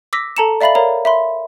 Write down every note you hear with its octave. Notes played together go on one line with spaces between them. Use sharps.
D6 E6 A#6 B6
A4 A5 A#5 C#7 E7
D5 E5 F5 B5 A6 F#7
A#4 C#5 F5 A#5
E5 B5 C6